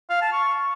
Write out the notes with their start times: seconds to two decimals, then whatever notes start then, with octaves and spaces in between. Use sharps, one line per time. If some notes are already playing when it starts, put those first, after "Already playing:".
0.10 F5
0.21 A5
0.32 C#6